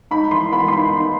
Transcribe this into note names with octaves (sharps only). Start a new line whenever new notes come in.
D#4 B5
E3 C6
B3 B5
C6
D#4 B5
D#4